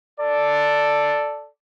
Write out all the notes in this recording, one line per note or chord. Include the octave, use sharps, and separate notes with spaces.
A4 D5